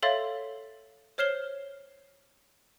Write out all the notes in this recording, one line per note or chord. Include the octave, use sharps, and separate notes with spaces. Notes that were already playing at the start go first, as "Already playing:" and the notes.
A4 C#5 E5 F5 C6 A6
C5 C#5 F6 C7 E7 G7